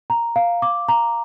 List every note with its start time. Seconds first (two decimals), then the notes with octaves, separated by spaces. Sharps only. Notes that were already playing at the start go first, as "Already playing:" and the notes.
0.10 A#5
0.36 F5
0.62 D6
0.89 A#5